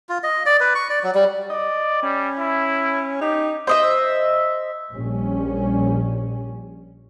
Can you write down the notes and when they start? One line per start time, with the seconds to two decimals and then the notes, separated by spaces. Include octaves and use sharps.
0.09 F4
0.23 D#5
0.46 D5
0.60 B4
0.75 C#6
0.90 D5
1.03 F#3
1.15 G3
1.50 D5 D#5
2.03 G3 C#4
2.39 E4
3.21 D#4 G4
3.67 C5 D#5 E5
4.94 A#1 G3 C#4